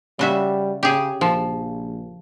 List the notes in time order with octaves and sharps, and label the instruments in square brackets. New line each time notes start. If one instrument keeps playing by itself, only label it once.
[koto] C#3 F#4 E5 [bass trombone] G3
[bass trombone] C#3 [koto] G4 G#4
[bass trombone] A#1 [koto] F3